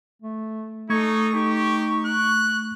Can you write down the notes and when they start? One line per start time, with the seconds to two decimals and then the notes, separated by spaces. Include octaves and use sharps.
0.22 A3
0.90 A3 D#4 A4 C#6 G#6
1.34 D#4 G4
2.06 F#6